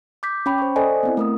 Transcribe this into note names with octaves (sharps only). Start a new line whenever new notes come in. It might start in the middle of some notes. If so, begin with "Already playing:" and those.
D6 G6 B6
C#4 G5 B5
C5 C#6
A4 C5 D5 D#5 G#5
B3 C4 E4
A3 A#4 D#6